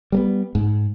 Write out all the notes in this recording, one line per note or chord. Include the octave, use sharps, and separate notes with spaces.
G3 A#3 B3
G#2